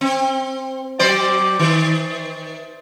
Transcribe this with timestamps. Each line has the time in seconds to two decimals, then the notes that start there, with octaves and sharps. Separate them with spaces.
0.01 C4
0.99 F#3 C5 D5
1.59 D#3